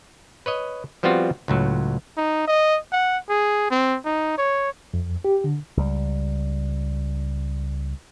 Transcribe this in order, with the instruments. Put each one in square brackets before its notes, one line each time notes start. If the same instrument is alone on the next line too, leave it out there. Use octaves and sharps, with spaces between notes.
[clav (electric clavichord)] B4 C#5 D#5
F3 G3 B3 C4 F4 F#4
C#2 A2 F#3
[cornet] D#4
D#5
F#5
G#4
C4
D#4
C#5
[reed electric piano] F2
G4
D3
[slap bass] C#2 G3